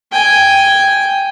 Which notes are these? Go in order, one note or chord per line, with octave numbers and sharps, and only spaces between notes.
G5 G#5